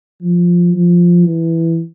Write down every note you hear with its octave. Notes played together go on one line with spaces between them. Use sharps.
F3
F3
E3